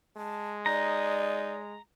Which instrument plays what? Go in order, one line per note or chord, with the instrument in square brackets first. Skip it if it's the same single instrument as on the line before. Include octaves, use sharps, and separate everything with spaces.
[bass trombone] G#3 [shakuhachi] A5
[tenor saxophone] D#4 [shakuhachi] D5 [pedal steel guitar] A#5